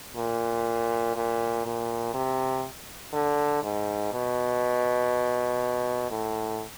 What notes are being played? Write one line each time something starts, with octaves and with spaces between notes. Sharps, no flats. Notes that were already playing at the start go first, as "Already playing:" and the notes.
A#2
A#2
A#2
C3
D3
G#2
B2
A2